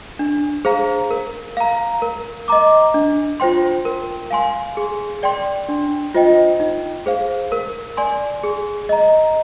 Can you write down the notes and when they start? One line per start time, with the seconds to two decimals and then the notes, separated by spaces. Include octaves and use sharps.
0.19 D4
0.65 G#4 C5 F5 A#5
1.11 A#4
1.57 F5 A#5
2.02 A#4
2.48 D#5 A#5 D6
2.94 D4
3.40 F4 C5 G5 C6
3.85 A#4
4.31 F5 G#5 C6
4.77 G#4
5.23 D5 G5 C6
5.69 D4
6.14 F4 C5 D#5 G5
6.60 D#4
7.06 G#4 C5 F5
7.52 A#4
7.97 D5 G#5 C6
8.43 G#4
8.89 D#5 A#5